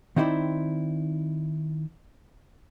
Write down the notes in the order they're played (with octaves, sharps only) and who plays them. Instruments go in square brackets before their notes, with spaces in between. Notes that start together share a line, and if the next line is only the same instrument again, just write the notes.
[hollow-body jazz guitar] D#3 C4 D#4 E4 C5 D5